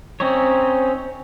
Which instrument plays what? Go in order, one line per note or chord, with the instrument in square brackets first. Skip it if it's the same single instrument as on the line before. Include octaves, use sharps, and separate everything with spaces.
[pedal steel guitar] C4 C#4 D#4 C#5